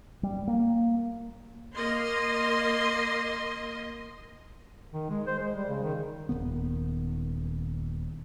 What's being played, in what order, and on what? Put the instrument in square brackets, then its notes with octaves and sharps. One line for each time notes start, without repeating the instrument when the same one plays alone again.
[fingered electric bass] G3
A#3
[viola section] A#3 D#5 C6
[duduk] D#3
G#3
C5
G#3
G3
C#3
D#3
[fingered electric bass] D#1 E2 D#3 B3